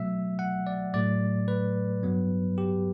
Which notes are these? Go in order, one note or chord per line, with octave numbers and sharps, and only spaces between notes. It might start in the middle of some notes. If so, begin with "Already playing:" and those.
Already playing: B2 F#3 A3 E5
F#5
D5
A2 F#3 A3 D5
B4
G2 F#3 B3
G4